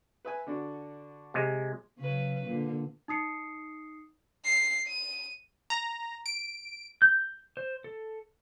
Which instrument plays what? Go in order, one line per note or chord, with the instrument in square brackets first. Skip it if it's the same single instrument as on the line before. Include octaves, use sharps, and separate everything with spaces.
[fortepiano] B4 E5 G#5
D3 D4 F#4
[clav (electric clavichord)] C3 G#3
[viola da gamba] C#3 F#3 B4
A#2 D3
[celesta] D#4 D#6 C7 C#7
[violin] C7
D#7
[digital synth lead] A#5
D7
[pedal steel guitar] G6
C5
A4